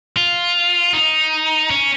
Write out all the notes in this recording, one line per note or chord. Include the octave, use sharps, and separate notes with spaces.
F4
D#4
C#4